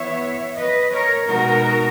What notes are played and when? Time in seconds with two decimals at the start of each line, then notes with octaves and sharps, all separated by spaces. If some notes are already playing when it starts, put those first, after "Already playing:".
Already playing: E3 B3 E4 C#5 E5
0.57 B4 D#5
0.92 A#4 C#5
1.28 B2 G#3 B3 D#4 F#4 A#4